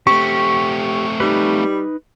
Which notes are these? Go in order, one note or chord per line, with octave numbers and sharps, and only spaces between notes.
A3 C4 G4 C#6
G3 D#4 B4